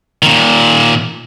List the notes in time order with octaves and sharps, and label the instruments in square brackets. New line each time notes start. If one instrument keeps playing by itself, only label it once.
[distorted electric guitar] A#2 D#3